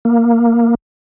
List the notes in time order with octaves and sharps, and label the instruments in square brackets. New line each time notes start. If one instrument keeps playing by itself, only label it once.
[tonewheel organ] A#3